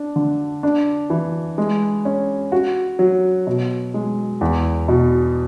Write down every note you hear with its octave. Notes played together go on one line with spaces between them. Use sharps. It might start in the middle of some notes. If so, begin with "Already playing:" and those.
Already playing: D4
D3
D4
E3
G#3
C#4
F#4
F#3
B2
G#3
E2
B2